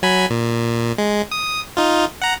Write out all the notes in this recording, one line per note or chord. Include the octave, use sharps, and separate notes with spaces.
F#3 G#5 B5
A#2
G#3
D#6
D#4 F4
F#5 A#5